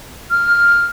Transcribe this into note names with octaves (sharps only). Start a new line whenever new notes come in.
F6